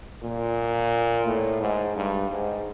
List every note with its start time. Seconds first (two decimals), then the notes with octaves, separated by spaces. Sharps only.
0.23 A#2
1.27 A2
1.61 G#2
1.96 G2
2.31 G#2